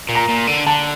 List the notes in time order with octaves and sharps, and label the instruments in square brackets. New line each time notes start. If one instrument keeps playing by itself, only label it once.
[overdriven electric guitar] A#2
[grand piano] A#5
[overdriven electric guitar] A#2
D3
[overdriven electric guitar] D3 [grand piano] A5